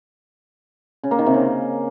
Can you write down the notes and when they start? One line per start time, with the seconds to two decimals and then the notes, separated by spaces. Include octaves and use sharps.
1.03 C#3
1.11 A#3
1.19 D#3
1.26 C3
1.34 C#3